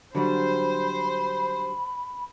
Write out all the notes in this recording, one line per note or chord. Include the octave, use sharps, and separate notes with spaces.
D3 F#3 G3 C5 B5